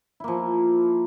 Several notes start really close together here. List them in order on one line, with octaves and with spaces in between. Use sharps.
E4 A#3 F3